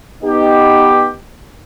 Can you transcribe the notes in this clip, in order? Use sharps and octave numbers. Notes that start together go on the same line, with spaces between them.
B3 D#4 G4